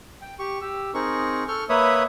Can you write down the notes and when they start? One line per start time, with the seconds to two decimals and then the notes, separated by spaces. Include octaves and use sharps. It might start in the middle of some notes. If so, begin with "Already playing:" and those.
0.22 G5
0.39 G4 C#6
0.61 G4 E6
0.94 C4 D#4 G#4 A#4 C#6
1.48 A4 C#6 F6 G6
1.69 A#3 B4 C#5 E5 B5 D#6